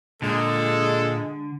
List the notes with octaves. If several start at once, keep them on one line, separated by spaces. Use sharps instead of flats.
A#2 D3 G#3 A4